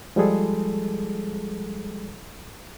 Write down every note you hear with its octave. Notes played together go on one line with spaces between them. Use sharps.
F3 G3 G#3 G#4 A4